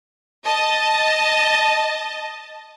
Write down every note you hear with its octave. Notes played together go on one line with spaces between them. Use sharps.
D#5 A5